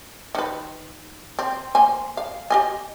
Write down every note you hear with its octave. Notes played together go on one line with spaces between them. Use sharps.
D#3 B4
C4
A#3 C5 G#5
F5
G4 D#5 G#5